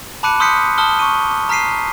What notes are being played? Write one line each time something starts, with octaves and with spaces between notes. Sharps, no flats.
A5 B5 D6 F#6 C#7 D#7
C6 D#6 F6 G6 B6 C#7
A5 D#6 F6 G7
C#6 D#7
A#5 F6 B6 C7 D#7